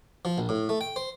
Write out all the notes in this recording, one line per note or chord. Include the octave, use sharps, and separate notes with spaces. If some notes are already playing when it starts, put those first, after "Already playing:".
F3
A#1
A2
A3
G5
C5